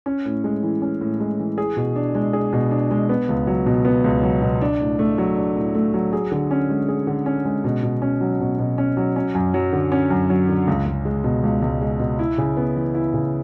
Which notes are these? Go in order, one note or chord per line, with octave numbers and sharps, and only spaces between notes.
C#4
A2
G#3
E3
C#4
A2
G#3
E3
G#4
B2
D4
G#3
G#4
B2
D4
G#3
B3
C#2
F#3
B2
B3
C#2
F#3
B2
D4
A2
A3
F#3
D4
A2
A3
F#3
G#4
D3
C#4
G#3
G#4
D3
C#4
G#3
B2
B2
C#4
F#3
B2
B2
C#4
F#3
C#4
F#2
F#3
D3
C#4
F#2
F#3
D3
C#2
C#2
G#3
B2
C#2
C#2
G#3
B2
E4
C#3
B3
E3
E4
C#3